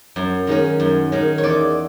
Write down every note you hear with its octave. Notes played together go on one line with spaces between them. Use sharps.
F#2
D#3 G#3 C#4
F#2
D#3 G#3 C#4
C#5
E2 D5